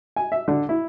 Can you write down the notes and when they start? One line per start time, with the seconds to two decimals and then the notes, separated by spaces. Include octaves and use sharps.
0.16 G#5
0.32 E5
0.48 D3
0.69 E4